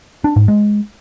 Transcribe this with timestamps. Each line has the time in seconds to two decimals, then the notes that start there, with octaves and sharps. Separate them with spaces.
0.24 D4
0.36 G#2
0.48 G#3